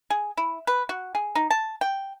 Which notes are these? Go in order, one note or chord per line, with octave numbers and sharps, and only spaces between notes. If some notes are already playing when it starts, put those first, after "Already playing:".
G#4
E4
B4
F#4
G#4
D#4
A5
G5